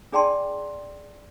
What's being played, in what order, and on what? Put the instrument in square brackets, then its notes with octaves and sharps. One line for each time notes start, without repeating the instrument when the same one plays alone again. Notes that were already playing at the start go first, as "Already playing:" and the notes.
[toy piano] D4 G#4 D5 G5 A5 C6